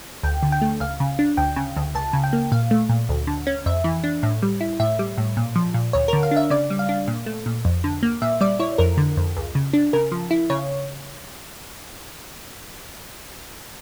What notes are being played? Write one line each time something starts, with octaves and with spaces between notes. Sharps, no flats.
D2 G5
D3
G5
A3
C#2 F5
C#3
D4
D2 G5
C#3
D2
C#2 A5
C#3
G5
A#3
A#2 F5
A3
A#2
D2
D3
C#4
F2 E5
E3
D4
A2
G3
E4
A2 E5
G3
A2
A#2
F3
A#2
D2 C#5
D3 A#4
F5
D4
E5
C#3 D5
G3
F5
D4
A#2
A3
A#2
F2
D3
A#3
A#2 E5
G3 D5
E4 C#5
F2 A#4
D3
F2
C#2
C#3
D4
C#3 A#4
F3
E4
C#3 C#5